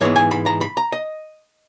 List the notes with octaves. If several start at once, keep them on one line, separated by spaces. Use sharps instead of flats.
G#2 E3 G#3 B3 C#5
G#5
B5
A#5
B5
A#5
D#5